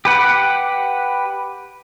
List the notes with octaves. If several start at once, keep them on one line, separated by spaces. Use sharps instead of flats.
G4 B4 F#5